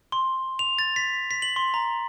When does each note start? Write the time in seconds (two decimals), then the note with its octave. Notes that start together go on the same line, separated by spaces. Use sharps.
0.12 C6
0.59 F7
0.79 A6
0.96 B6
1.31 B6
1.42 F#7
1.56 C6
1.74 A#5